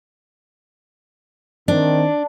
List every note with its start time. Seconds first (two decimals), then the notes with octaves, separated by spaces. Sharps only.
1.68 D#3 C4 D4